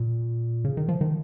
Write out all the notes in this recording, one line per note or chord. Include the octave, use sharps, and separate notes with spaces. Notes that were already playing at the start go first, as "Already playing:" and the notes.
Already playing: A#2
C#3
D#3
F3
D#3